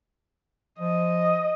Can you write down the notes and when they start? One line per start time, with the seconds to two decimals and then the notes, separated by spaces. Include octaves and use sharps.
0.79 F3 D#5